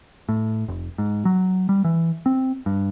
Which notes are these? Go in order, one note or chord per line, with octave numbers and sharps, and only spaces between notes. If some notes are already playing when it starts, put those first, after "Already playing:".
A2
F1
G#2
F#3
G3
E3
C4
G2